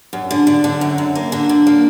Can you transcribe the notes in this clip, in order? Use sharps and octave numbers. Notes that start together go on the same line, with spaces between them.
F#2
D3
D3
D3
F#2
F#2
A#3
D3
D3
A#3